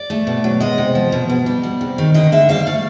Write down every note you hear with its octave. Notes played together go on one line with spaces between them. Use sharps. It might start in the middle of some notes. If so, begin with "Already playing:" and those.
Already playing: D5
A3
B2
F#3
G#3 D#5
C3
F3
B2
B2
G3
G3
C3
D#3
D3 D#5
D3 E5
G3 F5
A3